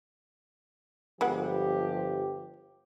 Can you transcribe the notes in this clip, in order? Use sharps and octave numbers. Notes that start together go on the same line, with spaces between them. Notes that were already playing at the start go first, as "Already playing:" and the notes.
G1 F3 G#3 B3 G4 F#5